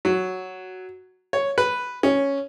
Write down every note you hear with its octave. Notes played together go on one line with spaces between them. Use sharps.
F#3
C#5
B4
C#4